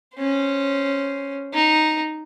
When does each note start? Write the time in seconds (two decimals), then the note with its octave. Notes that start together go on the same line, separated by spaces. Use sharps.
0.16 C#4 C5
1.54 D#4